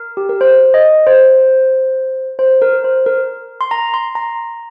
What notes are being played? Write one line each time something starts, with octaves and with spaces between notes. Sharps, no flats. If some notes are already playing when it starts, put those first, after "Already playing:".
Already playing: A#4
G4
A#4
C5
D#5
C5
C5
A#4
C5
A#4
C6
A#5
C6
A#5